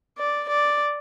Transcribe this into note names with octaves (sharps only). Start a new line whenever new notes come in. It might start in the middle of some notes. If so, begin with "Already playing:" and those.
D5
D5